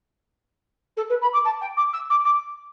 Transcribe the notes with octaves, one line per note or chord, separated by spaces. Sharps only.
A4
B4
B5
D6
A5
G5
D6
E6
D6
D6